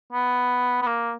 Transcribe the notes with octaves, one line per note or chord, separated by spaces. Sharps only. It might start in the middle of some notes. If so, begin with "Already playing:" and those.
B3
B3
A#3